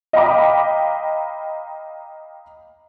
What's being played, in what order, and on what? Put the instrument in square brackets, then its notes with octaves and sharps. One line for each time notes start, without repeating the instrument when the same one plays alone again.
[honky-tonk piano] D#5 F5 G5 A#5 B5 D6